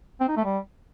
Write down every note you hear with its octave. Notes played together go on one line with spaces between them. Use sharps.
C4
D#4
A3
G3